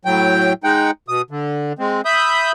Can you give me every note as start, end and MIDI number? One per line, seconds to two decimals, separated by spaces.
0.05 0.53 45
0.05 0.53 54
0.05 0.53 79
0.64 0.91 56
0.64 0.91 63
0.64 0.91 78
0.64 0.91 79
1.08 1.22 47
1.08 1.22 87
1.30 1.73 50
1.79 2.01 56
1.79 2.01 60
2.05 2.52 76
2.05 2.52 83
2.05 2.52 87
2.05 2.52 91